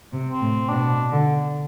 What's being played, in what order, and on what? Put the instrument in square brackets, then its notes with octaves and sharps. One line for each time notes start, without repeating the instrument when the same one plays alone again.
[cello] C3
[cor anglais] C4
[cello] A2
[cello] B2 [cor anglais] D4
[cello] D3